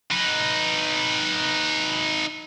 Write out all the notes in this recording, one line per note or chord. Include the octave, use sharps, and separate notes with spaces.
D#4 B4